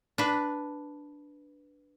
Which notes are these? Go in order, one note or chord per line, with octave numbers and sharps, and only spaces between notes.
D4 B4